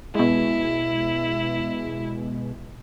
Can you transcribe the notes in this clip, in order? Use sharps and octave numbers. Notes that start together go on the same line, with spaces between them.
B2 G#3 E4